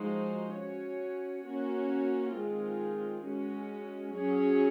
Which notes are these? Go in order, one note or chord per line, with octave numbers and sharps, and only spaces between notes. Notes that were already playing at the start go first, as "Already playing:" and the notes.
Already playing: F3 G#3 D#4 F#4 C5
C#4 F#4 C#5
A#3 C#4 F#4
D#3 G#3 C4 F4 G#4
G#3 C#4 F#4
F#3 C#4 G#4 C#5